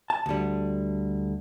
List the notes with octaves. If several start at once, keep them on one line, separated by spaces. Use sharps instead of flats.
A5
D2 D3 G3